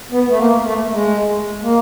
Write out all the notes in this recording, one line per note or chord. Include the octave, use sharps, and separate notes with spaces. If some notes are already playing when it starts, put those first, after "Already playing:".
B3
A3
A#3
A3
G#3
A#3